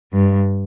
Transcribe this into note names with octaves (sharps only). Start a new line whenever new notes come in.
G2